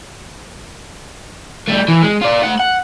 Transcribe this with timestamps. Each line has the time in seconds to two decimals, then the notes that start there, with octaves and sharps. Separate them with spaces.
1.68 G3 A3
1.88 E3
2.02 G#3
2.21 F4 D5
2.43 A3 F#5
2.60 F#5